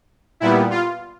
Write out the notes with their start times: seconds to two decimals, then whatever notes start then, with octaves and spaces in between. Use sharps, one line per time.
0.40 A#2 G3 B3 E4
0.70 F4